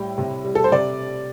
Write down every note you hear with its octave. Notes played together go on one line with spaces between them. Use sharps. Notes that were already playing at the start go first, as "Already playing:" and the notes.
Already playing: A2 G3 G5
C3
G3
A4
C5
C3 D5